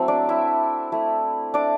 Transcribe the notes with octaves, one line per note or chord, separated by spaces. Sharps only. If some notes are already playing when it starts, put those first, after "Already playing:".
Already playing: F#3 A3 C4 E4 A4 C5
D4 D5
E4 E5
A3 E4
D4 D5